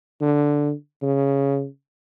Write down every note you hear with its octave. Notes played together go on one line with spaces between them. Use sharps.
D3
C#3